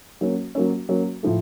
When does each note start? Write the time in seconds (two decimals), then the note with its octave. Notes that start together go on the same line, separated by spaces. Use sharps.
0.21 F#3 A#3 C#4
0.55 F#3 A#3 C#4
0.89 F#3 A#3 C#4
1.23 A2 F3 A3